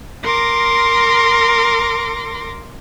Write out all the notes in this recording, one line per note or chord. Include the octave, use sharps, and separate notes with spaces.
A#4 C6 D6 A#6